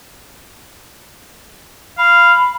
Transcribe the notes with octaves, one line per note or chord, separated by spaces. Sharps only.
F5 B5